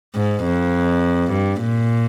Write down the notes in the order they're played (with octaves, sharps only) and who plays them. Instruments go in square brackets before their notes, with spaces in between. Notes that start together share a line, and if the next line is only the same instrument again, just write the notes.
[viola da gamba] G#2
F2
G2
A#2